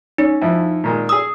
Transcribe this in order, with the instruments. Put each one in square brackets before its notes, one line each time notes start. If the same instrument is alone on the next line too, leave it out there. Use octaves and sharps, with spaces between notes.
[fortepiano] C#4 [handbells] D#4
[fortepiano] F2 F3 E4
A#2 D#3 G#3
[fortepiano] G#4 E6 [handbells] D#6